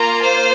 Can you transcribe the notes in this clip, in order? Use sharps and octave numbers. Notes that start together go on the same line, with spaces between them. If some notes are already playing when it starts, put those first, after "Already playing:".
Already playing: A#3 F4 A#5
C5